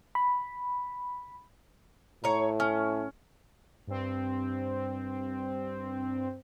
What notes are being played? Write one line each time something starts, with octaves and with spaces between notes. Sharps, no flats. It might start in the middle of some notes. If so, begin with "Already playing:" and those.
B5
A2 C#5 A#5
C#4
G2 C4